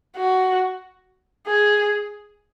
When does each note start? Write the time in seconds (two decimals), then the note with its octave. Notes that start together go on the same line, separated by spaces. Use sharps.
0.17 F#4
1.47 G#4